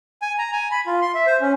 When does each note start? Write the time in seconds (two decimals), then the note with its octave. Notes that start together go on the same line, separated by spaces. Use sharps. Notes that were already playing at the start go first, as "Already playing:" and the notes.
0.22 G#5
0.38 A#5
0.53 G#5
0.71 B5
0.87 F4
1.02 C6
1.14 E5
1.27 C5
1.41 C#4